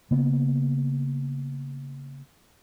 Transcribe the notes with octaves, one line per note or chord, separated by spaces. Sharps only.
C#3 A#3 B3